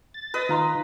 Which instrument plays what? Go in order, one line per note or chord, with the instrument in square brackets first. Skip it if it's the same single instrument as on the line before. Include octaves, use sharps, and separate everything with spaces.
[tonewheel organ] A6
[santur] B4 D#5
[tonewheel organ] D#3 [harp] F4 A#5 C6